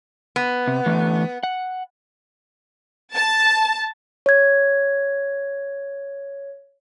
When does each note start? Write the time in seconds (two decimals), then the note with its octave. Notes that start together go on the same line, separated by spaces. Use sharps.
0.36 B3
0.68 C3
0.86 D3 E3 A3
1.43 F#5
3.14 A5
4.26 C#5 G#6